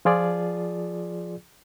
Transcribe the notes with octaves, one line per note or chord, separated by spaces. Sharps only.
F3 F4 G#4 D5